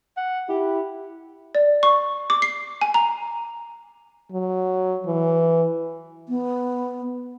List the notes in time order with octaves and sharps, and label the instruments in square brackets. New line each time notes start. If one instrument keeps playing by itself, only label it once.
[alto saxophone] F#5
[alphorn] E4 [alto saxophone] G4
[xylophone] D5
C#6
D6
C7
G#5
A#5
[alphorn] F#3
E3
[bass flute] B3